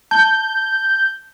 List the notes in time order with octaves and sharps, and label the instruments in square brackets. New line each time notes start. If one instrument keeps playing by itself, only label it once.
[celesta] A5 [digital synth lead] G6